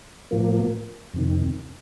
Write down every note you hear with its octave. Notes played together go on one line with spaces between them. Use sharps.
A2 F3 A#3
F2 C3 D#3